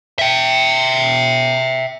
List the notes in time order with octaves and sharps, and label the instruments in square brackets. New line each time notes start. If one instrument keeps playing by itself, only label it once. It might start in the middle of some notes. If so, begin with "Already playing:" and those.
[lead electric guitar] E5 G5